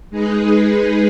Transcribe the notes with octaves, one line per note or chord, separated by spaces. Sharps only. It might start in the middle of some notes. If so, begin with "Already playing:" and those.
G#3 D#4 G#4 B4